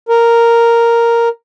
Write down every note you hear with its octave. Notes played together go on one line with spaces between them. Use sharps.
A#4